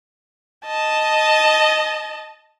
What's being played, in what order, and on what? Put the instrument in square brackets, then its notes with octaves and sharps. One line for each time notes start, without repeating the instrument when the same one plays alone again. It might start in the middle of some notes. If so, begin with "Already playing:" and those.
[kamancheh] D#5 A5